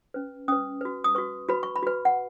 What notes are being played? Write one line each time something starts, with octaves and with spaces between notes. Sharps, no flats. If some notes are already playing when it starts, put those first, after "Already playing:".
C#4 B4
C#4 B4 D#6
F#4 B4
D#6
F#4 B4 C#6
F#4 B4 B5
C#6
B5
F#4 B4
F#5